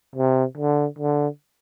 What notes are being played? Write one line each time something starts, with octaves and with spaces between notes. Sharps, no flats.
C3
D3
D3